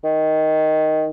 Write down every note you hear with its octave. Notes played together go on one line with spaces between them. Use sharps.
D#3